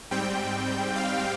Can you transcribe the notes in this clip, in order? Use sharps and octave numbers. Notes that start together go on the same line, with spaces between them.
G#2 G3 C4 G5
F5